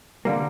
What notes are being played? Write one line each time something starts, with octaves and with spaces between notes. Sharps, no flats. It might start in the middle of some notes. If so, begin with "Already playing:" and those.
D3 G3 A#3